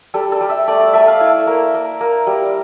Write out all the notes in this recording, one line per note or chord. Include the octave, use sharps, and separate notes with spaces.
G3 A4
A4
G3
E5
A3 D5
D5
A3 E5
F5
E4 E5
A#3
A#3
A#3
G3